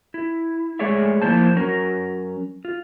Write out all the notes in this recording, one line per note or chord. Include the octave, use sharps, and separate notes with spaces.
E4
G#3 A3 G#4 C#5 D5 E5
F3 A#3 E4 C5 A5
F#3 C#4 A#4
F4